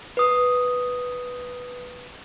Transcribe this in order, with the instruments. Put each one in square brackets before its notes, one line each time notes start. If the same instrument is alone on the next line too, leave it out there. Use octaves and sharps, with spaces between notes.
[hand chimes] B4 D#6